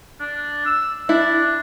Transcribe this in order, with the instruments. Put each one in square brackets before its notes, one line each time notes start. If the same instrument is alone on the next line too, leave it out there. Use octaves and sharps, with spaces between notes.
[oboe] D4
E6
[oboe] D4 [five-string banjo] E4